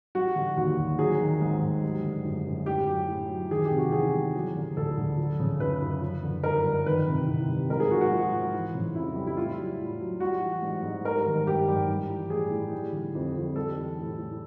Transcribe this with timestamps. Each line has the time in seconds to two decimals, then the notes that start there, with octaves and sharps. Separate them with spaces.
0.15 G3 F#4
0.36 D3
0.57 D#2 F#4
0.78 D#2
0.99 F#3 G#4
1.21 D#3
1.42 G#2
1.62 G#2
1.83 G3
2.04 D3
2.25 F#2
2.46 F#2
2.66 A2 G4
2.88 F#3
3.08 A2
3.29 F#3
3.51 D#3 G#4
3.65 G4
3.71 C3
3.78 F#4
3.92 E2 G#4
4.14 G3
4.35 F#3
4.55 D3
4.77 D2 A4
4.97 D2
5.18 F3
5.40 C#3
5.60 F#2 B4
5.81 F#2
6.01 F3
6.22 D3
6.43 G2 A#4
6.65 G2
6.86 D#3 B4
7.07 C3
7.27 C2
7.48 G3
7.70 G#2 A#4
7.80 G#4
7.91 F3 F#4
8.01 F#4
8.11 G#2 F4
8.33 F3
8.54 E3
8.75 C#3
8.95 F2 E4
9.16 G3
9.27 E4
9.37 A2 F4
9.58 F#3
9.80 A2
10.00 F#3
10.20 G3 F#4
10.42 E3
10.62 G#2
10.83 G#2
11.05 G3 A#4
11.26 D#3
11.46 G2 G4
11.68 G2
11.88 G3
12.10 E3
12.30 A2 G#4
12.51 A2
12.73 G3
12.93 D3
13.15 F2
13.36 F2
13.56 G3 A4
13.77 E3
13.99 A2
14.18 A2